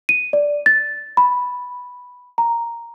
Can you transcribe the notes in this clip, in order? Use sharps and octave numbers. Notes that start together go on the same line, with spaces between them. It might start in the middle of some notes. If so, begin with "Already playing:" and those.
D#7
D5
A6
B5
A#5